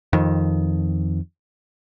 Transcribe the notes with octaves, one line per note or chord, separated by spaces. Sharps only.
F2 D#3